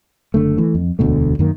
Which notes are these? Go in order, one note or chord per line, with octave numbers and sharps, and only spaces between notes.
F#1 D3 A3
E3 A3
F2
E1 D2 B2 A3
F#2 D#3 A#3